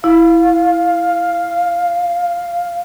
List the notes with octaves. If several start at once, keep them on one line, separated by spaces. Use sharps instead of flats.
E4 F5